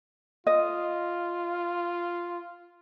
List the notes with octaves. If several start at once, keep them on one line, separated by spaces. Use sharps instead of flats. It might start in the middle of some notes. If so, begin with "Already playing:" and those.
F4 D#5